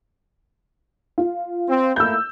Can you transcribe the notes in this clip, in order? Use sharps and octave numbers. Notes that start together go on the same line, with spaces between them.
F4
C4
A3 A#3 E4 E6 G6